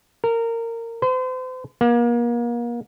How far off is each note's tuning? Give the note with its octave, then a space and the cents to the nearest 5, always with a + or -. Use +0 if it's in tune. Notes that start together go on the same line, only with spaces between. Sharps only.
A#4 -20
C5 -40
A#3 +35